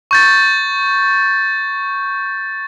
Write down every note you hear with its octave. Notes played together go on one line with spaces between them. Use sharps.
C#6 G6 A6